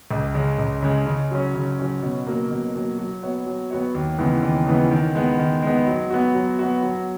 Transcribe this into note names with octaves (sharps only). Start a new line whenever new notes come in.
C#2
C#3 G#3
C#2
C#3 G#3
C#3
F#3 C#4
C#3
F#3 C#4
B2
F#3 A#3
B2
F#3 A#3
F#3
B3 F#4 C#5
F#3
B3 F#4 C#5
D#2
C#3 E3 G#3 B3
D#2
C#3 E3 G#3 B3
D#3
G#3 B3
D#3
G#3 B3
F#3
B3 F#4
F#3
B3 F#4
F#3